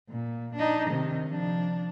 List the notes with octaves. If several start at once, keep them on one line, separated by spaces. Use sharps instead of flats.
A#2
D4 D#4
C3 D#3
F3 D4